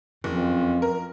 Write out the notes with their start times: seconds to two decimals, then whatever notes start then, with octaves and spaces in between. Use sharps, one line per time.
0.24 F#1 F2
0.82 A#4